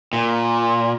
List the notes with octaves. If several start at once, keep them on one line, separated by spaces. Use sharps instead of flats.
A#2